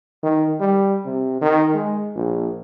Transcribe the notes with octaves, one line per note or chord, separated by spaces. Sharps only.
D#3
G3
C3
D#3
G#3
A#1